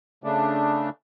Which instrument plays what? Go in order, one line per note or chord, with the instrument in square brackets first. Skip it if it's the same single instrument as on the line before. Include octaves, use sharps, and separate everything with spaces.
[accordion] C#3 A3 D4